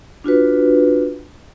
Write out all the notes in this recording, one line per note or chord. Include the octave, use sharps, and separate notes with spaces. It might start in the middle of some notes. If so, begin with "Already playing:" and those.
D4 F4 F#4 B4